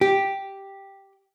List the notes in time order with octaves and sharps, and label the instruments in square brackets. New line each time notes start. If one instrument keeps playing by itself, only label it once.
[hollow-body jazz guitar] G4